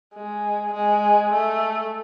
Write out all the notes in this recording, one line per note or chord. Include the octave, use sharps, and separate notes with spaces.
G#3
G#3
A3